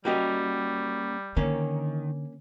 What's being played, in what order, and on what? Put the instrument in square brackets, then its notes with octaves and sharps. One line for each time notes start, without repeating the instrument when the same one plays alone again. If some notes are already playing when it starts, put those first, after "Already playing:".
[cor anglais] G3 [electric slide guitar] A#3 C#4 A#4 [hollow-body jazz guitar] F#4 G4 D#5
[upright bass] D3 [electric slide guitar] D#3 [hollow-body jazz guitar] A#3 C#4